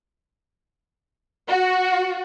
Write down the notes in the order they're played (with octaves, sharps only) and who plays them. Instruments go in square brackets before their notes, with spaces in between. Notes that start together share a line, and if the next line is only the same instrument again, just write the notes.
[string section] F#4